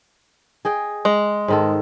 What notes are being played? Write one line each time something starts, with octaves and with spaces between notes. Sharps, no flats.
G#4 D#5 G5
G#3
G#2 D#3 A4